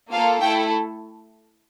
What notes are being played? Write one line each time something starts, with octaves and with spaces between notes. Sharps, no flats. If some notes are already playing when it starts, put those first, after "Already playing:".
A#3 F4 A4 F5
A3 E4 A4 G5